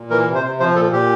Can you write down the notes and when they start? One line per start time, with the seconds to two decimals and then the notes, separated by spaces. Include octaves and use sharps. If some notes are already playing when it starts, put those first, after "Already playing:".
Already playing: A#2
0.10 E3 A#4
0.26 C3
0.35 C5
0.44 C3
0.60 F3 C5
0.76 A#2 A4
0.93 A#2 G4